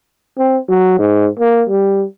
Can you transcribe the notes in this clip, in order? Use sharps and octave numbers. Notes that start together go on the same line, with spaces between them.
C4
F#3
G#2
A#3
G3